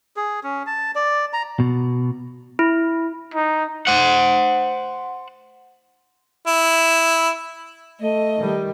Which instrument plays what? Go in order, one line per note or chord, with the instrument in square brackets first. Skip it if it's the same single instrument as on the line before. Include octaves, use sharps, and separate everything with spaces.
[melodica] G#4
C#4
A5
D5
A#5
[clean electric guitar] B2
[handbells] E4
[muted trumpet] D#4
[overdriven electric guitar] C5 F#5
[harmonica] E4
[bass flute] A3 [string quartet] D#5
[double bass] D#3 G3